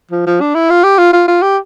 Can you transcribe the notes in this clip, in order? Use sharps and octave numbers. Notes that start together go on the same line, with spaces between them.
F3
F3
D4
E4
F4
G4
F4
F4
F4
G4